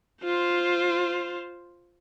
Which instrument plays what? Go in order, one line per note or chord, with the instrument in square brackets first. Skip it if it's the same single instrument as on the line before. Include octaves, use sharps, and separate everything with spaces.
[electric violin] F4 C5